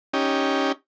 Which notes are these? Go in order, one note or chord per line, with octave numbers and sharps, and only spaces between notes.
C#4 D#4 G4